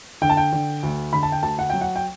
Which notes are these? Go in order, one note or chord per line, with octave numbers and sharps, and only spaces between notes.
D3 G5
A5
G5
D3
D2
D3 B5
A5
G5
D2 A5
F#5
F#3 G5
F#5
G5